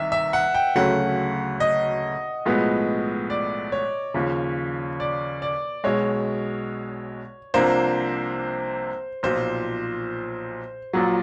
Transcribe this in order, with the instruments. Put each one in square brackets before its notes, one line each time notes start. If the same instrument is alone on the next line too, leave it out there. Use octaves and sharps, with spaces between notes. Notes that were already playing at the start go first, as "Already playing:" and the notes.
Already playing: [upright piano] C2 C3 D#3 [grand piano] E5
[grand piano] E5
F#5
G5
[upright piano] D2 C#3 F#3 A3 C#4 [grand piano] F#5
[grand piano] D#5
[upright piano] B1 A2 F3 G#3 B3
[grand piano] D5
C#5
[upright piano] D#2 C#3 F3
[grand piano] D5
D5
[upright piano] B1 B2 G#3 [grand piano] C#5
[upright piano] C2 C3 F3 A#3 D4 [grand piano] C5
[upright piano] B1 A#2 F3 [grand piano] C5
[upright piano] A#1 A#2 F#3